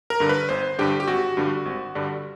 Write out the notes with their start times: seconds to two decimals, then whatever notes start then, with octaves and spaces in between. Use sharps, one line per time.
0.10 A#4
0.20 G2 D3
0.29 B4
0.49 G1 C5
0.78 G2 D3 G4
1.00 G4
1.07 G#1 F#4
1.37 G2 D3 G3
1.65 G#1
1.95 G2 D3 G3